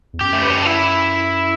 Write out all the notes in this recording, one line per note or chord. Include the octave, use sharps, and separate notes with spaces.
E2
F#2 G4
A3
B3
C#4
D4
E4